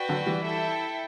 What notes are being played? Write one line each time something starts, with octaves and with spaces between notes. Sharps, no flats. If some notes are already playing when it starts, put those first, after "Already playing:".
Already playing: F#4 B4 D5 G5
D3 F#3
E3 G3
E4 A4 E5 G5